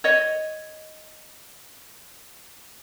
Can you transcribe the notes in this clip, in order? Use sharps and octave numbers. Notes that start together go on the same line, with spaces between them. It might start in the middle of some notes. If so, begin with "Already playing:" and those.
C#5 D#5